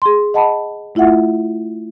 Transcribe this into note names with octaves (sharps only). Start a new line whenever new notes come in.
G#4 C6
D#5 F#5 A5 B5
A3 E4 F4 E5 F#5